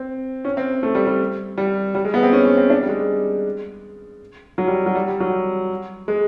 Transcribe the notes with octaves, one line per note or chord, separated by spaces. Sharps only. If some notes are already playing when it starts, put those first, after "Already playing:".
Already playing: C4
C#4
C4
A3
G3
G3
G3
G3
G#3
B3
C4
C#4
C#4
C4
D4
G3
G#3
F#3
G3
F#3
G3
G3
F#3
G#3